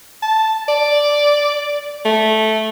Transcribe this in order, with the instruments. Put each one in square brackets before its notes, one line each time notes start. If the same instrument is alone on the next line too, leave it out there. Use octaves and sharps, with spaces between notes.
[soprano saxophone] A5
D5
A3